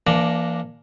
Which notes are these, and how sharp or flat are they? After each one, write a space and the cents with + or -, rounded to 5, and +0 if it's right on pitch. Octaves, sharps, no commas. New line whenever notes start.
E3 +40 A#3 +0 D4 +0